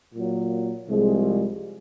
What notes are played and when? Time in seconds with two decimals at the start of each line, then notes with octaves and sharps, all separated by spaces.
0.13 A#2 F#3 A#3
0.89 C2 C3 F3 G#3